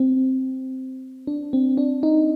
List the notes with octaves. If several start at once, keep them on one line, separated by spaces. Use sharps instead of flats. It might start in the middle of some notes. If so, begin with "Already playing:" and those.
Already playing: C4
D4
C4
D4
D#4